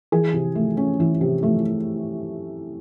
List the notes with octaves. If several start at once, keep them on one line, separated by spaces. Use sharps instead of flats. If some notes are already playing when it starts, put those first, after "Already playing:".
E3 G#4
C3
A3
C#4
E3 E4
C3
A3